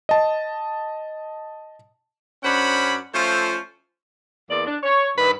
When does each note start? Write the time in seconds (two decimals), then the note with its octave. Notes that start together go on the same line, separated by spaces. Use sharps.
0.09 D#5 A5
2.43 F#2 C#4 D4 C5 F#5 B5
3.14 F3 A3 C#4 F4 A4 C5
4.50 E2 A#3 D5
4.66 D4
4.83 C#5
5.18 G2 D#3 B4